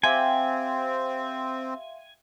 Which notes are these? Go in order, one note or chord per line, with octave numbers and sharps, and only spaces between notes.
C4 G4 E5 F5 G#5 C6